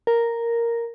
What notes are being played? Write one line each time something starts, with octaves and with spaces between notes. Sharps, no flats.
A#4